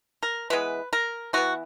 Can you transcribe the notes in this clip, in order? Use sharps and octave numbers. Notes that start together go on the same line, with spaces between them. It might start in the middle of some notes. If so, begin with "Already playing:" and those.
A#4
E3 G#3 B3 B4
A#4
E3 B3 F#4